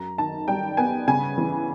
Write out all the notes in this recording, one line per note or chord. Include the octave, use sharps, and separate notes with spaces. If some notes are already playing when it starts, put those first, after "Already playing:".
Already playing: F#2 A#5
D#3 A5
G3 G5
B3 G#5
C#3 G#5
E3